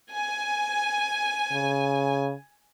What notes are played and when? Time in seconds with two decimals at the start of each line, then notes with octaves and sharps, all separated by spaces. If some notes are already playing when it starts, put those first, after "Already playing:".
0.14 G#5
1.52 C#3